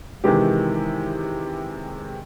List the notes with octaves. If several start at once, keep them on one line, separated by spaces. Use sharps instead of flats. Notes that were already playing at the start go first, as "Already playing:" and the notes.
C3 D#3 E3 G#3 G4